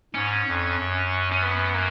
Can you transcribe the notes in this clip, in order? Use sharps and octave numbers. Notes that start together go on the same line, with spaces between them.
G#2 C#4
F2
F#2
C#4
B3
A#3